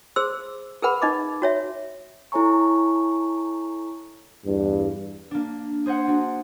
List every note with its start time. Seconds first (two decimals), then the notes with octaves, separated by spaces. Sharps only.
0.16 G#4 C5 C6 E6
0.83 G#4 A#4 B4 F#5 B5
1.02 D#4 D#5 D6
1.42 F#4 C#5 E5
2.32 E4 A4 C#5 G#5 A#5 C#6
4.45 E2 G2
5.31 A#3 D4
5.86 G#4 C5 D#5 F#5
6.07 D4 F#4